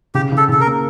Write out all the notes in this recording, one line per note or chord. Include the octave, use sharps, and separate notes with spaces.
C#3 G4
C#3
A4
C#3 A4
A#4
A#3